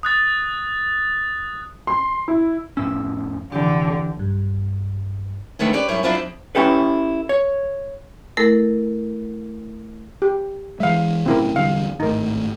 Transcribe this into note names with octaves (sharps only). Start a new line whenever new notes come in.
D#6 F#6 A6
C6
E4
F2 A2 C#4 E6
F1 D3 E3 G4
B1 G2
D3 D#3 A3 B3 C#4
C#4 G4 B4 D5
F#2 G3 E4 C#5
F#3 D4 E4 F4 C5
F2
C#4 E4 G4 A4 B4
C#5
A3 E4 A4 A#4
G4
E3 G#3 E5 F5
B1 A2 C#3 C4 E4 A#4
E1 D3 G3 F5
G#1 A2 D#4 A#4